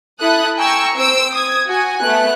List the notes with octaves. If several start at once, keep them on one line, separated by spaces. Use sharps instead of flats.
E4 A4 D#6 F#6
G5 G#5 A#5 C#6 E6
C4 C5 E6 D7
D#6 G#6
F#4 G#5
A3 B3 F#6